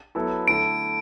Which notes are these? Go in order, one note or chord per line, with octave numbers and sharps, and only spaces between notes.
F#3 B3 E4 A4
D3 A3 E4 A4 D7